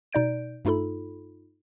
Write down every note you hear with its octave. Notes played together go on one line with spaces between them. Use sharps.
B2 D#4 D5 G6 D7
G2 A3 D#4 F4 A4 B5